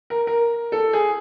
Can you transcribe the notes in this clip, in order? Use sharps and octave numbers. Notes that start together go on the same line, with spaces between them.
A#4
A#4
A4
G#4